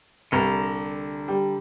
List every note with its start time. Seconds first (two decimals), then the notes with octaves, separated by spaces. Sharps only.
0.32 C2 D3 A4 A#5
1.28 G3